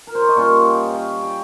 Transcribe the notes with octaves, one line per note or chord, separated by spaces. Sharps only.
A#4
C5
C#5
D#5
A#2 G3 C#4 F4 C#5 F5
D#5 G5
C#5 F5
G4